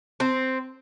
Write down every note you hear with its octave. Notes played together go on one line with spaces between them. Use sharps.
C4